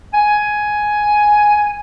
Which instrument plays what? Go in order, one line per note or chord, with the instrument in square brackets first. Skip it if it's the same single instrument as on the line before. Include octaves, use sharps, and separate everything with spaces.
[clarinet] G#5